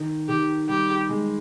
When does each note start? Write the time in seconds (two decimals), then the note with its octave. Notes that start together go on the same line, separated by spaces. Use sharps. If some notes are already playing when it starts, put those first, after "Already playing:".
Already playing: D#3
0.28 D#3 G4
0.68 G3 G4
1.09 G#3